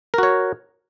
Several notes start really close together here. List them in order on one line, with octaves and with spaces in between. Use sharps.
A#4 F#4 C#5